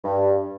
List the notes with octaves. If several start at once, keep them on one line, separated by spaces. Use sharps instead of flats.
G2